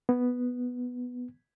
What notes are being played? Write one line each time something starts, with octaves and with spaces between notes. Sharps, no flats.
B3